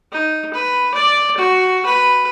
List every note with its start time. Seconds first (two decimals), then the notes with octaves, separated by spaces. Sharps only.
0.12 D#4
0.53 B4
0.94 D5
1.37 F#4
1.86 B4